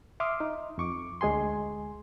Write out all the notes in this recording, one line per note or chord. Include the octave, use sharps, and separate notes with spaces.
E5 C6 D6 D#6 F6
D#4
F2 C#6 D6
D2 G#3 G#4 G#5 C6